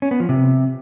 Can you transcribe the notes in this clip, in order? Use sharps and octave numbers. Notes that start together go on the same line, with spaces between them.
C#4
B3
F3
C3